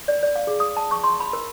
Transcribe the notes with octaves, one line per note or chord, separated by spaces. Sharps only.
D5
D5
F5
G#4
D#6
A5
C#6
C6
B5
A#4